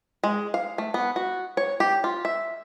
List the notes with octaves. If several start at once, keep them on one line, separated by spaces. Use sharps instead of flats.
G#3
F5
A3
B3
F#4
C#5
G4
F4
E5